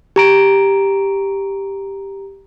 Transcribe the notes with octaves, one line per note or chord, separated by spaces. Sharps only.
G4 A#5 D7